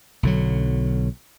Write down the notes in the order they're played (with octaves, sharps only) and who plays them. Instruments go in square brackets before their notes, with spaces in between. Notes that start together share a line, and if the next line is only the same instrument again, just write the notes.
[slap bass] B1 D3 F#3